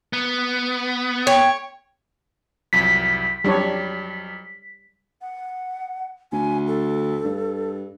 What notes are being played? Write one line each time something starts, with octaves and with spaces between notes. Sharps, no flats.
B3
C#5 G5
C2 F2 F#3 B6
F2 F#3 G3 D4 C#5
F#5
D2 G#5
A4
G2